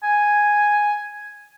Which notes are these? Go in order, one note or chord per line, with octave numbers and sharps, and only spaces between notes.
G#5